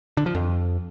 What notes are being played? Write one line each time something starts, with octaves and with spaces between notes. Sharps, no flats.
D3
F3
F2